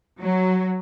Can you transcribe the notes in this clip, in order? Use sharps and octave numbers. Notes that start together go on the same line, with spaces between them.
F#3